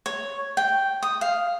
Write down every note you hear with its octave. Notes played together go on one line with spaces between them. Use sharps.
C#5
G5
D#6
F5